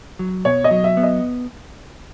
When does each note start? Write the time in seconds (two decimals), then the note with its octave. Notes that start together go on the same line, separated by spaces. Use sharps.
0.19 F#3
0.45 B2 C#5
0.64 D#5
0.71 F#3
0.84 E5
0.97 B3
1.03 D#5